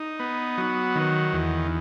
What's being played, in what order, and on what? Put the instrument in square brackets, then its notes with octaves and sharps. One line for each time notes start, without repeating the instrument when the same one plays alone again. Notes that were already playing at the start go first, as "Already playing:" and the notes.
Already playing: [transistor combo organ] D#4
B3
F#3
D#3
E2